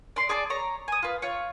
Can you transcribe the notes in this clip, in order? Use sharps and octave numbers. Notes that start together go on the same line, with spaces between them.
D5 C6
G#4 D5 A5 D6
C#5 A#5
G#5 D#6
F4 B4
F4 C#5